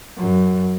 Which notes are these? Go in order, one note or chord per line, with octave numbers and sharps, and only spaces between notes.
F#2